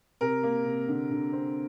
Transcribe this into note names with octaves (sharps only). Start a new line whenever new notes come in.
C3 A#4
A#3
C3
D3
D3
C4